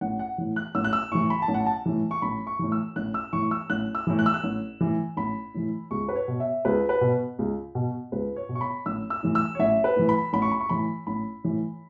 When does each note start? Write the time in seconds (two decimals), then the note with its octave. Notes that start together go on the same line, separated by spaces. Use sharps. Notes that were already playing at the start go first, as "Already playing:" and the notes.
0.01 A1 F#5
0.19 F#5
0.38 A2 E3
0.56 F#6
0.75 A1 E6
0.84 F#6
0.93 E6
1.12 A2 E3 C#6
1.30 B5
1.42 A5
1.48 A1
1.54 F#5
1.66 A5
1.86 A2 E3
2.11 C#6
2.22 A1 B5
2.47 C#6
2.59 A2 E3
2.72 E6
2.96 A1 F#6
3.14 E6
3.33 A2 E3 C#6
3.51 E6
3.70 A1 F#6
3.95 E6
4.07 A2 E3
4.19 F#6
4.26 E6
4.34 F#6
4.44 A1
4.81 A2 E3
5.17 A1 B5
5.54 A2 E3
5.91 C#2 C#6
6.09 B4
6.16 C#5
6.28 B2
6.40 E5
6.65 C#2 B4
6.89 B4
7.01 B2
7.39 C#2
7.75 B2
8.12 C#2 B4
8.36 C#5
8.49 B2
8.55 C#6
8.61 B5
8.86 A1 E6
9.10 E6
9.23 A2 E3
9.35 E6
9.55 C#5
9.59 A1 E5
9.84 B4
9.96 A2 E3
10.09 B5
10.33 A1 B5
10.42 C#6
10.51 B5
10.60 C#6
10.69 A2 E3 B5
11.07 A1 B5
11.44 A2 E3